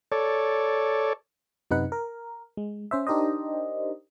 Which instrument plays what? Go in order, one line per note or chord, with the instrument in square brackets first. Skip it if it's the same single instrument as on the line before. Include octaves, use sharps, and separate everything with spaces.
[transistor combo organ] A4 C#5 D5
[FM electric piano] F#2 C3 D#4 B4 F#5
A#4
G#3
C#4 C5 E5
D4 D#4 G4 A#4 C5 D#5